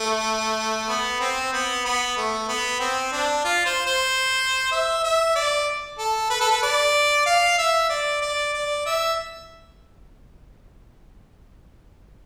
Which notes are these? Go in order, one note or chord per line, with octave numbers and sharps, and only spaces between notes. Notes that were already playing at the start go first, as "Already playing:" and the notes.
Already playing: A3
B3
C4
B3
B3
A3
B3
C4
D4
F4
C5
C5
E5
E5
D5
A4
B4
A4
B4
D5
F5
E5
D5
D5
D5
E5